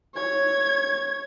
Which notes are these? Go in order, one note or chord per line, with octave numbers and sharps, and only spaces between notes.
C#5 G#6